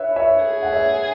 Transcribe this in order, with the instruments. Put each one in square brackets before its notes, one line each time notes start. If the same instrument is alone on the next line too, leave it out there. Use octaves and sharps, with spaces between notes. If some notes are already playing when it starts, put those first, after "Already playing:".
Already playing: [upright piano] B4 C#5 E5
C#5 E5
[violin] G#4
[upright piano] F#5
C#5 E5